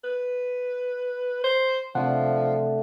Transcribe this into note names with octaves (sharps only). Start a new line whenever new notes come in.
B4
C5
C3 F3 A3 D4 F#5